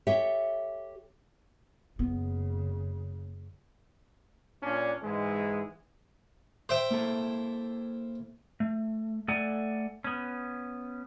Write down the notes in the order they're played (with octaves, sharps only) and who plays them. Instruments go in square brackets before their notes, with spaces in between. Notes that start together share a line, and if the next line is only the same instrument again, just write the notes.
[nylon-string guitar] G4 A4 C#5 E5 G5
[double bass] F#1 C#3 [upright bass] B3
[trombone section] A#2 C#4 D4
G#2 E3 G#3
[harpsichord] C5 E5 G5
[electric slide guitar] A#3 E4 A4
A3
A3 A4 D5 F#5 G#5
B3 C#4